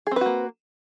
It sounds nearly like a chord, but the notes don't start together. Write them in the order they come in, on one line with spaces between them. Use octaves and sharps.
G#4 C4 B4 F#4 A#3